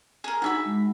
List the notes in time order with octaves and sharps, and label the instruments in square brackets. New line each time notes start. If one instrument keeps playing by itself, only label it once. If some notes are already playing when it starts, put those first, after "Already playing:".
[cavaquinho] G#4 A#4
[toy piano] D4 D#4 G#4 [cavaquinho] F#4 E5 B5
[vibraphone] G#3